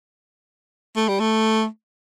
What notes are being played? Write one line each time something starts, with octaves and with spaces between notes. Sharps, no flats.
A3
G3
A3